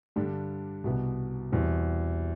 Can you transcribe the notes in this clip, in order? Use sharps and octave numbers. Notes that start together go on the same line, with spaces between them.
G2 D3 G3 D4
C2 B2 B3
E2 B2 G3 C4